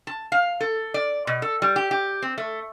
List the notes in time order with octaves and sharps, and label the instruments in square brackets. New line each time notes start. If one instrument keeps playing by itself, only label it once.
[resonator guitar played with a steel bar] A5
F5
A4
D5
B2
A4
G3
G4
G4
C4
A3